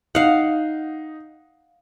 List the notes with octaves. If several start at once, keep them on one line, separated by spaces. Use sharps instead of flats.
D#4 F5 F#5